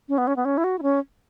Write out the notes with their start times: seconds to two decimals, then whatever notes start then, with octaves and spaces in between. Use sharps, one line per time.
0.09 C#4
0.18 B3
0.27 C#4
0.36 B3
0.45 C#4
0.58 E4
0.64 F#4
0.79 E4
0.83 C#4